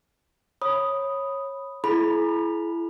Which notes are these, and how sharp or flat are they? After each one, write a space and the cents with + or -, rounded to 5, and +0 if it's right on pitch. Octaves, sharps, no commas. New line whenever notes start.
C#5 -15 B5 +0 D#6 +0
E4 +20 G#4 +40 B5 -5